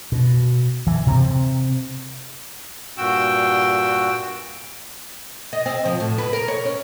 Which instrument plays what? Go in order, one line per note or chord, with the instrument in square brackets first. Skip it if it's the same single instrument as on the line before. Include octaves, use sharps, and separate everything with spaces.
[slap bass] B2
E3
C3 C4
[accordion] G2 A#2 F#4 G5 E6
[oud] D#5
C4
F3
A2
B4
A#4
C#5
C#4